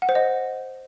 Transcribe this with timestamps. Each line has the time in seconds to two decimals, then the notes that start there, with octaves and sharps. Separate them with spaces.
0.02 F#5
0.09 C5
0.15 D#5